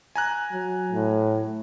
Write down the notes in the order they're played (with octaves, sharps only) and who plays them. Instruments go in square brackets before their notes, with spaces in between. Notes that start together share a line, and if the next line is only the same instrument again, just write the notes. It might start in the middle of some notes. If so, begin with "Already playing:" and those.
[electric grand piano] G#5 A#5 F#6
[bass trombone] F#3
A2